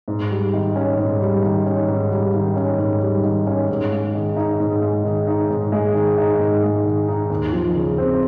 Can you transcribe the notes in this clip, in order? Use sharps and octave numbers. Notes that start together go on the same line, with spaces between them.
G#2
G3
D#3
C#4
G#2
G3
D#3
C#4
G#2
G3
D#3
C#4
G#2
G3
D#3
C#4
G#2
G#3
D#3
D#4
G#2
G#3
D#3
D#4
G#2
G#3
D#3
D#4
G#2
G#3
D#3
D#4
D#2
F3
C#3
C4